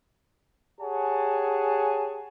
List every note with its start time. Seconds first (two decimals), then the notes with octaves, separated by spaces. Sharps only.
0.81 G4 G#4 C#5 F#5 G#5 A5